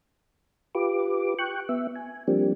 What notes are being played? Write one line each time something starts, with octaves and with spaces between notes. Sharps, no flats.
F4 G4 B4 D6
G5 C#6 F#6
B3 E5
G#5
F3 G3 A#3 C4 D4 G4